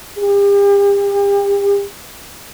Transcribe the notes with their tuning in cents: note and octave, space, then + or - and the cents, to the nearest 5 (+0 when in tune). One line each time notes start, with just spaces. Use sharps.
G4 +40